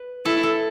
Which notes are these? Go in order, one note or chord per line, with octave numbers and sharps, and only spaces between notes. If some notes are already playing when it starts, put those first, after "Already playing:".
Already playing: B4
E4 A4
A4